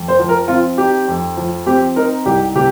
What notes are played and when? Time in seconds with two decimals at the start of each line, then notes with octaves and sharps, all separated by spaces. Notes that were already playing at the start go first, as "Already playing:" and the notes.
Already playing: F2
0.08 C5
0.19 F3
0.29 A#4
0.48 C4 F4
0.78 D#4 G4
1.08 F2
1.37 F3
1.66 C4 G4
1.96 D#4 A#4
2.26 C2 G4
2.55 C3 G4